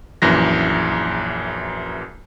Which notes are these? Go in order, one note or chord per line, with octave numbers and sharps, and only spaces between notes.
A#1 F#2 E3 A#6